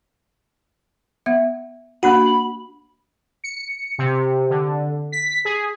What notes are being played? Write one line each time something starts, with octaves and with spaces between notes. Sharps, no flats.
B3 E5
A#3 D4 F#4 F#5 B5
C#7
C3
D3
B6
G#4